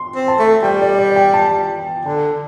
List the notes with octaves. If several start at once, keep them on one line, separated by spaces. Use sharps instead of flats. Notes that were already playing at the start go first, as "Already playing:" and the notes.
Already playing: C6
C4
A5
A3
G3 G5
D5
D5
G5
A5
D3 A5